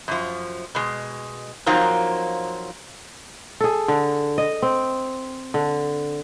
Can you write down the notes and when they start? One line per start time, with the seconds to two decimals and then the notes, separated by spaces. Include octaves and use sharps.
0.08 F#2 F3
0.75 B2 G#3
1.66 F3 F#3 A#3 C4 D#4 F4
3.60 G#4 A4
3.88 D3
4.38 D#5
4.62 C4
5.54 D3